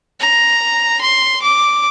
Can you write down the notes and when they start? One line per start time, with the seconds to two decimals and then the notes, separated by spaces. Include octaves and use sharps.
0.20 A#5
1.01 C6
1.42 D6